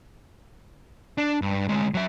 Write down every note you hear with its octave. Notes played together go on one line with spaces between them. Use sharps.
D4
G2
D2 G#3
F#3 E5